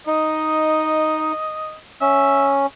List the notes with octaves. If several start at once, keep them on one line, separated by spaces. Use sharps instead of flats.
D#4 D#5
C#4 E5